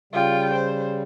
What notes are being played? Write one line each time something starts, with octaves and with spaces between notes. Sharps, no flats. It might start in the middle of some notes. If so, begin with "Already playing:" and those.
C#3 G3 F4 G5
C5